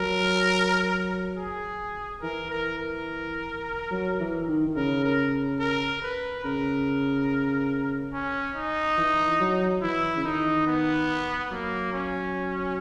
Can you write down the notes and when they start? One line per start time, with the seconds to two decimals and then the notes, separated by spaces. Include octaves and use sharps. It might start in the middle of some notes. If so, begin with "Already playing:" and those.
Already playing: F#3 A#4
1.37 G#4
2.22 E3 A#4
2.51 A#4
2.78 A#4
3.91 F#3
4.20 E3
4.48 D#3
4.67 D#3
4.76 C#3 A#4
5.04 A#4
5.60 A#4
6.02 B4
6.45 C#3 A#4
8.13 C#4
8.56 D#4
8.98 E3
9.40 F#3
9.82 E3 E4
10.17 C#3
10.24 D#3 D#4
10.67 B3
11.51 F#3 A#3
11.93 C#4